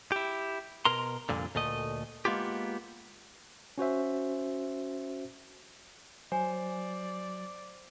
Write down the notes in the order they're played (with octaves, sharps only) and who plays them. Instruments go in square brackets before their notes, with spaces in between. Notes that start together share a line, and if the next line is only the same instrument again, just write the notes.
[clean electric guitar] E4 G4
B2 A#4 A#5 C6
C2 F2 A#2 D3
D2 A#2 A3 D#5
G#3 A#3 B3 F4 G4
[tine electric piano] C#4 F#4 C5 E5
[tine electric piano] F#3 [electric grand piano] C5 [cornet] D5 [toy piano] G#5